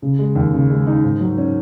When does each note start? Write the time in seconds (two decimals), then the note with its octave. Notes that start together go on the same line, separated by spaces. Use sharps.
0.02 C#3
0.19 G#3
0.35 D#2
0.53 C#3
0.70 G#3
0.87 D#4
1.04 G#2
1.20 F#3
1.38 C#4